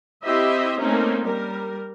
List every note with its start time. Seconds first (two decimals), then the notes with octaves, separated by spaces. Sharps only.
0.23 C4 E4 G4 C5 D#5 E5
0.80 A3 A#3 C4 C#4 D#4 A#4
1.24 G3 A#4